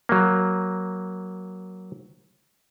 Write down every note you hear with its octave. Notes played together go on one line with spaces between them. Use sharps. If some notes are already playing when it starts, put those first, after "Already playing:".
F#3 A#3